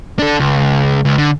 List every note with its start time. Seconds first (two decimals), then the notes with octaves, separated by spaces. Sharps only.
0.19 D4 A4
0.40 C#2
1.05 C#2
1.18 D3